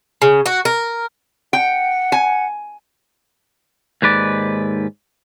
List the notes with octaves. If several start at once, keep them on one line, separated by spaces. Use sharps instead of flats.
C#3
F#4
A#4
F#5 G5
G#5
D#2 G#2 B4 D5